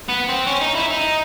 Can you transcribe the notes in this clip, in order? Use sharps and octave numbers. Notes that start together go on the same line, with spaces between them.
B3
C4
C#4
D#4
E4
D#4